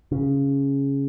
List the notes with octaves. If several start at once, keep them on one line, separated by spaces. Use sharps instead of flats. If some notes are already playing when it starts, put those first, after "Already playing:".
C#3